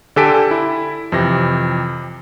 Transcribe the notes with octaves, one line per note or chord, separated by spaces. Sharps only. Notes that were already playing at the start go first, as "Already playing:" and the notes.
D3 G4 A4 G#5 B6 D7
E4
F2 C3 E3 A#6